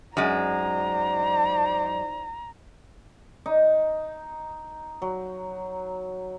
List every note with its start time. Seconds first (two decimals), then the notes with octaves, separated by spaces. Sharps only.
0.17 F#2 G#3 D#4 C5 D5 A#5
3.46 D#4
5.02 F#3